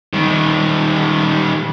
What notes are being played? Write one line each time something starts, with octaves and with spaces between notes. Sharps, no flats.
D#3 G3